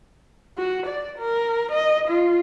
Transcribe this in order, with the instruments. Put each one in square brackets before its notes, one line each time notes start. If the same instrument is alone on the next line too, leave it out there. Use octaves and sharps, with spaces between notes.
[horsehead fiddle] F#4
D5
A#4
D#5
F4